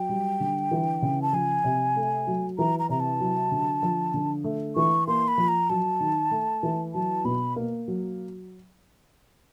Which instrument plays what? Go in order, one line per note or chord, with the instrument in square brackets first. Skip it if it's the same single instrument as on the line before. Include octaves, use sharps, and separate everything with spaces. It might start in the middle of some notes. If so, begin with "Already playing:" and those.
Already playing: [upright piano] F#3 [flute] G5
[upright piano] G3
D3
E3
C#3
[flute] A5
[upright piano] F3 [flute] G#5
[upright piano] C3
A3
F#3
[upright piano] E3 [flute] A#5
[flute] A#5
[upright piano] C3 [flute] A#5
[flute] A5
[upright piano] F#3
D3
F3
D3
A3
[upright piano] E3 [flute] C#6
[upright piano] A#3 [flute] C6
[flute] B5
[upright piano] F3
[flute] A#5
[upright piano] F#3 [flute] A5
[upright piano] D#3
A3
E3
[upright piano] F#3 [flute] A5
[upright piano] B2 [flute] B5
[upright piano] A#3
F#3